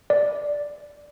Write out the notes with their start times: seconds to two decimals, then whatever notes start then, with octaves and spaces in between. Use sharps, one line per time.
0.10 D5